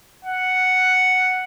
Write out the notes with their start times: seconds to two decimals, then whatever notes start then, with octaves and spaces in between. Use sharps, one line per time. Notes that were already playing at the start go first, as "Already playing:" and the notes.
0.25 F#5